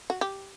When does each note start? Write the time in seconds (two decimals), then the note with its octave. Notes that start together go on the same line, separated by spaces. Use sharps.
0.10 F#4
0.21 G4